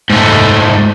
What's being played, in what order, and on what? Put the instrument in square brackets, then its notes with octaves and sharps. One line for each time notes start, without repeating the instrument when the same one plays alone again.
[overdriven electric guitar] G#2 A3